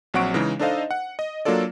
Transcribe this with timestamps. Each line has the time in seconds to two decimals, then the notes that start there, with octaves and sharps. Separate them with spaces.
0.14 A#1 F#3 C4 F#5 C#6 D7
0.34 C#3 E3 G#3 D#4
0.59 D4 D#4 A4 C5 D#5 F5
0.91 F#5
1.19 D#5
1.45 F#3 A#3 D4 F4 A4 D5